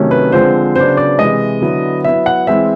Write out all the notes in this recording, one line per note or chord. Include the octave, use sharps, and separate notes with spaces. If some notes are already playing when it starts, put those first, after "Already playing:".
Already playing: C3 D#3 F#3 A3 C#4
B4
D3 F3 G#3 C4 C5
C#3 F#3 B3 D4 C5
D5
C3 E3 G#3 D#5
D3 F#3 B3 E4
F#3 B3 E4 E5
F#5
E3 G#3 C4 E4 E5